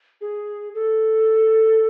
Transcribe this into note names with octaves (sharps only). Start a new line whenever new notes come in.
G#4
A4